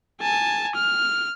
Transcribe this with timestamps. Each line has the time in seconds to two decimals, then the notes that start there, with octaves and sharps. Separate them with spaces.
0.21 G#5 A5
0.75 F6